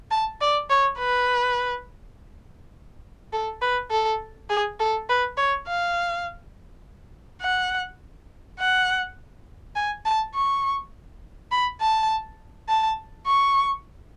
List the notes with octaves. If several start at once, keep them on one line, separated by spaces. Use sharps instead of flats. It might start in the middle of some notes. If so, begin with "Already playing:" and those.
A5
D5
C#5
B4
A4
B4
A4
G#4
A4
B4
C#5
F5
F#5
F#5
G#5
A5
C#6
B5
A5
A5
C#6